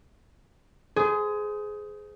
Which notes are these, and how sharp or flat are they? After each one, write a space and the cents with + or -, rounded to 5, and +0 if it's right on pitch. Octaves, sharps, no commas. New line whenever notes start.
G#4 +15 C5 -25